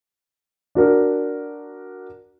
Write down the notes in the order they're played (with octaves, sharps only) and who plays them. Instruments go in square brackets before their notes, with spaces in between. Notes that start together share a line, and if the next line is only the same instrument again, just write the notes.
[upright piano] D4 F#4 A#4